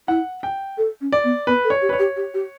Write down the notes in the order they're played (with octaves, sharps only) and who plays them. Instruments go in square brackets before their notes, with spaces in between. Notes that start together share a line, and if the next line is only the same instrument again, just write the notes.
[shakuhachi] E4 [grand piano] F#5
[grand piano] G5
[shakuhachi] A4
C#4
[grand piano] D5
[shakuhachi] B3
[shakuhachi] B3 [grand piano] B4
[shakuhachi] A4
[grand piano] C#5
[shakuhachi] G4
[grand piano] B4
C#5
[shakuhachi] G4
G4
G4